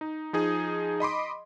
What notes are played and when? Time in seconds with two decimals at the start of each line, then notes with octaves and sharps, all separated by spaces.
0.01 D#4
0.33 F3 D#4 G#4
1.00 D#5 B5 C6 D6